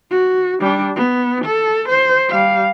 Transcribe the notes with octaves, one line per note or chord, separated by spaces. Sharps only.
F#4
G3 D4
B3
A4
C5
G3 F5